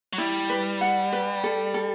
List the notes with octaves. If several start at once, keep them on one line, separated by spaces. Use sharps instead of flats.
F#3
G3 E4
B4
F#5
B4
A4
A4